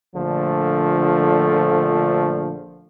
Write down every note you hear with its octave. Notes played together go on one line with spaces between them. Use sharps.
A#1 D3 F3 A3